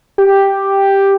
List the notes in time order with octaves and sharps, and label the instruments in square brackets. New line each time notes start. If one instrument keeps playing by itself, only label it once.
[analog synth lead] G4